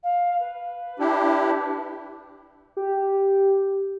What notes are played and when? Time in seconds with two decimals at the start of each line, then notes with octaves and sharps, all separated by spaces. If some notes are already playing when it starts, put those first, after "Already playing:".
0.03 F5
0.39 B4
0.99 D4 E4 G4
2.77 G4